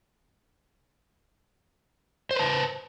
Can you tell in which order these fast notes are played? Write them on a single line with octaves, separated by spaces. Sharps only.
C5 B4 A5